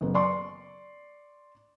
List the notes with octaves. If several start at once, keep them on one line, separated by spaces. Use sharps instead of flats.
F#1 B3
D5 C6 C#6